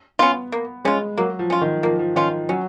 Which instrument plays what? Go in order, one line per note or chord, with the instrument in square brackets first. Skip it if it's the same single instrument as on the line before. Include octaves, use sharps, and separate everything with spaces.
[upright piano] B3 [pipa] C#4 F4
[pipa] A#3
[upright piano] G#3 [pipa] C#4 F4
[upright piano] F#3 [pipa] A#3
[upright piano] F3
[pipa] C#4 F4
[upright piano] D#3
[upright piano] F3 [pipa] A#3
[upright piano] F3
[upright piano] D#3 [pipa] C#4 F4
[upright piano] F#3 [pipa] C#4